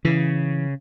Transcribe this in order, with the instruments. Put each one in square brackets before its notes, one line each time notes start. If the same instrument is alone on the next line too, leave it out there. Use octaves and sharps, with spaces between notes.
[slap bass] C#3 [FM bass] E3